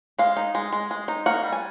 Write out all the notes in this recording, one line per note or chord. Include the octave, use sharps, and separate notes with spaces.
G#3 F5
D#4
G#3
G#3
G#3
D#4
A#3 F#5
G3
G#5